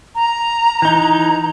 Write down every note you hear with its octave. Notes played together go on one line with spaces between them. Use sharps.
A#5
E3 D#4